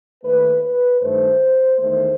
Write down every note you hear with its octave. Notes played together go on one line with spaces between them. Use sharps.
D#2 D#3 A3 B4
B4
G2 D#3 A3 C5
E2 D#3 A3 C5